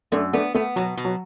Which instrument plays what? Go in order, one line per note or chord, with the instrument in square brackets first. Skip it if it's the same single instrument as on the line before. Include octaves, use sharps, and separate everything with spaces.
[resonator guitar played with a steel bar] F#2 [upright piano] A3 D4
[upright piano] A3 D4 [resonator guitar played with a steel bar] B3
[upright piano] A3 [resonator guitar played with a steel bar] B3
[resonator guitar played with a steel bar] B2 [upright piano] F#3
[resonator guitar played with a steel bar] B2
[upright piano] F#3